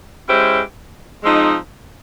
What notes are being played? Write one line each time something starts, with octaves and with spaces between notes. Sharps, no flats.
G#3 C#4 E4 G4 C5
F3 G#3 C4 D#4